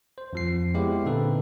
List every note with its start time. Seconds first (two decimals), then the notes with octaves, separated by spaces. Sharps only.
0.18 C5
0.33 F2 F3 C7
0.74 G#3 B3 E4 G4 C#5 F5
1.04 A#2 D3 C4 D#4 A4 B4